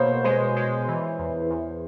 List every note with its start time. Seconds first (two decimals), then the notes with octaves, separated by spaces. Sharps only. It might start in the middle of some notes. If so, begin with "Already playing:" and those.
Already playing: B2 A#3 C5 C#5
0.24 G#3 C5
0.56 G#3
0.88 E3
1.19 E2
1.50 E2